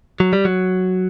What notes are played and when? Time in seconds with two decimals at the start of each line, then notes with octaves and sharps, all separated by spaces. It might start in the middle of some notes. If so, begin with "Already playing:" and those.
0.20 F#3
0.33 G3
0.45 F#3